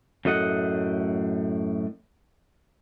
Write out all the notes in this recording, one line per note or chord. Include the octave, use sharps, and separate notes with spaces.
F#2 A2 A3 D#5 F#5